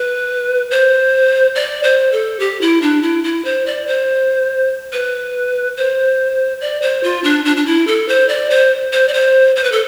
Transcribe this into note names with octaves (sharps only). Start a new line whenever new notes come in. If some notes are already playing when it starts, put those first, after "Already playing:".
Already playing: B4
C5
D5
C5
A4
G4
E4
D4
E4
E4
C5
D5
C5
B4
C5
D5
C5
F4
D4
D4
D4
E4
A4
C5
D5
C5
C5
D5
C5
C5
B4
A4